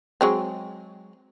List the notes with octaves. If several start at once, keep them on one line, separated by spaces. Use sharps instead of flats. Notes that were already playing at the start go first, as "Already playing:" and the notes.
F#3 G#3 C4